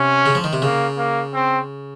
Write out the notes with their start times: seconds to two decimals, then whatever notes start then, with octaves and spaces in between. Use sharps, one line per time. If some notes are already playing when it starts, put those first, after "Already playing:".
Already playing: C3 C#4
0.26 C#3
0.35 F3
0.44 D#3
0.53 C3
0.62 C#3 A#3
0.98 A#3
1.34 C4